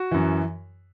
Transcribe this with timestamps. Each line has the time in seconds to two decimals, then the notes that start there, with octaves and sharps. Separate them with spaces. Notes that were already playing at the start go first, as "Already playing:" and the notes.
Already playing: F#4
0.11 F#2 E3